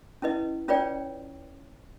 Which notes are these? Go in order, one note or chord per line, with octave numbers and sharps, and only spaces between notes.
C#4 E4 B4 D#5
C#4 F4 B4 C#5 D5 G5